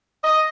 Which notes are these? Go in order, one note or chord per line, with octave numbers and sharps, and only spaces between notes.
D#5